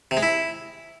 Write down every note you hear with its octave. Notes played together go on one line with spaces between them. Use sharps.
C3
G#3
E4